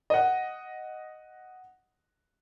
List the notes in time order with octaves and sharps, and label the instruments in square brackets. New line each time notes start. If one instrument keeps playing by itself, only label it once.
[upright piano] D#5 F#5